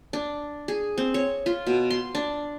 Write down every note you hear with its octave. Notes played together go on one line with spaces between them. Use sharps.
D4
G#4
C4
C#5
F4
B2
C6
D4